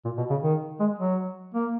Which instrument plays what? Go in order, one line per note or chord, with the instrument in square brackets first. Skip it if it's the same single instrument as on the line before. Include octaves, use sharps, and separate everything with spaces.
[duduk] A#2
B2
C#3
D#3
G#3
F#3
A#3